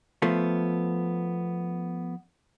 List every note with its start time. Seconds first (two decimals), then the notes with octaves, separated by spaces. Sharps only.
0.22 F3 A3 B3